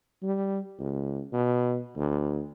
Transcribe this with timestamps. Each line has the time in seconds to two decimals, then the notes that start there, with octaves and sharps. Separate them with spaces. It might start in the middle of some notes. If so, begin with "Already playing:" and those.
0.22 G3
0.79 C#2
1.33 B2
1.96 D2